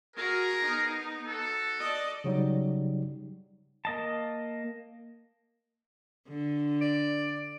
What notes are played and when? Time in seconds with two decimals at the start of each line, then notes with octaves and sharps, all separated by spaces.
0.16 F#4 G#4 A#4
0.63 B3 D#4
1.27 F#4 A4
1.80 D5 D#5
2.24 C#3 F#3 G3 D#4
3.85 A#3 D#5 A5
6.28 D3
6.81 D5